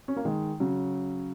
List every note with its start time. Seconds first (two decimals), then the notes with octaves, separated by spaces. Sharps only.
0.08 C#4
0.16 A#3
0.25 D#3 G#3
0.60 C#3 F#3